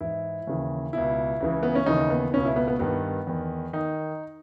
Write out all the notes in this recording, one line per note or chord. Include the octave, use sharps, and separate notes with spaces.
G#2 E3 E4
D#2 C#3 E3
C#2 B2 E4
C#2 C#3 E3
B3
C#4
D#2 C#3 E3 D#4
B3
C#2 B2 C#4
E4
B3
B3
G2 D#3 B3
E2 D#3
D#3 D#4